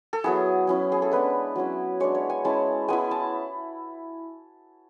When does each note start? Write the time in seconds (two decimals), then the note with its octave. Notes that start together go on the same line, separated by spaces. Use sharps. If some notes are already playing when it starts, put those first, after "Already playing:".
0.13 A4
0.24 F#3 B3 E4 G#4
0.67 F#3 C#4 E4
0.92 G#4
1.02 A4
1.12 G#3 B3 D4 B4
1.56 F#3 C#4 E4
2.00 G#3 D4 C#5
2.15 C#5
2.30 G#5
2.45 G#3 C#4 E4 A5
2.88 G#3 B3 E4 G#5
3.11 A5